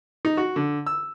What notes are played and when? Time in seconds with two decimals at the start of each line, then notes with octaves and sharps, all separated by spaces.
0.25 D#4
0.37 F#4
0.56 D3
0.86 E6